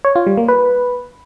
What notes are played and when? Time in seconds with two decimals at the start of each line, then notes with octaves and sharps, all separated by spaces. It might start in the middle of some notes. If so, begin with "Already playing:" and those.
0.05 C#5
0.16 F4
0.27 G3
0.37 A#3
0.48 B4